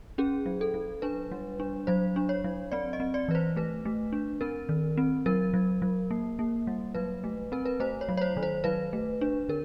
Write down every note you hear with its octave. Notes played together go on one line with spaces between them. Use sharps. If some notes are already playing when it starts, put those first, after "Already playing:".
C#4 G#4
F#3
A4
F#3
D4 B4
G3
D4
F#3 C5
D4
C#5
F#3
C4 D5
D#5
C4
D5
E3 B4
C5
A3 B4
A3
D4
C4 A#4
D#3
C4
F#3 A#4
F#3
F#3
A#3
A#3
G3
F#3 B4
A3
C4 A#4
B4
A3 C5
C#5
F#3
C#5
C5
D#3
C5
F#3 B4
A3
D4
D3 A#4